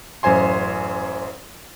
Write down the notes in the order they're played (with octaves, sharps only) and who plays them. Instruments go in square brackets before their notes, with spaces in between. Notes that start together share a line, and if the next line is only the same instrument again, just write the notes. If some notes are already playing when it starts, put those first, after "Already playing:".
[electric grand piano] A1 F#2 C5 G#5 C6